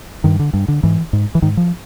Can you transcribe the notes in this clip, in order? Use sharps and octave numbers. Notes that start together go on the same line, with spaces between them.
G2 D#3
D3
G2
D3
G#2 E3
G#2
E3
G#2 D#3
F3